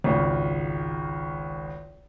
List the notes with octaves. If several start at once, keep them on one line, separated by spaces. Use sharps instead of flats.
G#1 C#2